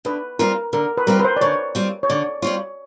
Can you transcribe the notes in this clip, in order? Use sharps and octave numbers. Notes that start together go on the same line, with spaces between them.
D3 B4
G3 C4 F4 A#4
D3 A#4
B4
G3 C4 F4 A#4
B4
C5
D5
D3 C#5
G3 C4 F4
C#5
D3 D5
G3 C4 F4 C#5